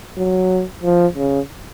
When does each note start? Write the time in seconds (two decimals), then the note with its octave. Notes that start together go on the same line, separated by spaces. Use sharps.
0.17 F#3
0.83 F3
1.16 C#3